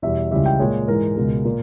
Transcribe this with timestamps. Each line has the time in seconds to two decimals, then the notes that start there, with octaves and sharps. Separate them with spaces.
0.02 E2 B2 G3 E5
0.31 C#2 C#3 E3 G3 E5
0.46 G5
0.59 A#2 G#3 C#5
0.88 G#2 E3 G#3 A#4
1.16 C#2 B2 G#3
1.45 A#2 A#4